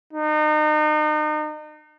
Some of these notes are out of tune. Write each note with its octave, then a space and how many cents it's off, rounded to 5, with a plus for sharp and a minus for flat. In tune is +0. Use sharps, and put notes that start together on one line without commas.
D#4 -35